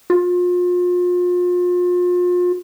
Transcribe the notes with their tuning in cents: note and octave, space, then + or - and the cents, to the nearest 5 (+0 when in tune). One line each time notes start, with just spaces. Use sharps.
F4 +35